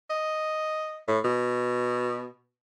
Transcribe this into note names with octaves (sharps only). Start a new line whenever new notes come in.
D#5
A2
B2